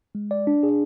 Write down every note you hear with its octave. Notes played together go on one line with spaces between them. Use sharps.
G#3
D5
D4
G#4